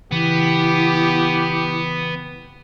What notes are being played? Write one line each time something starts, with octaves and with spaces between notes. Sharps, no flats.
C#3 E3 B3 E4 G4